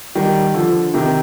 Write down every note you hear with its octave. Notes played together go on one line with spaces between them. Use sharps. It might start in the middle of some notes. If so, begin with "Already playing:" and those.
D#3 G3
D3 F3
C3 D#3